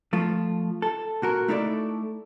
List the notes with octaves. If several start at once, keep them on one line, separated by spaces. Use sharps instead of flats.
F3 A3 F4
A4
A#2 F#4 A#4
A3 D#4 E4 A4 C#5 D5